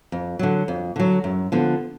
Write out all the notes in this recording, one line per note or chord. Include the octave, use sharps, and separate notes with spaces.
F2
D3 F#3
F2
D3 F#3
F#2
D3 F3 B3